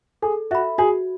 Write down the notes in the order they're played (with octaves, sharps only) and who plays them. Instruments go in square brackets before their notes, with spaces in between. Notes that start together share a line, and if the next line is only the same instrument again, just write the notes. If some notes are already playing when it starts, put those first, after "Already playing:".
[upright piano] G#4 [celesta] A4
[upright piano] F#4 [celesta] E5 B5
[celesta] F#4 [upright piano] G#4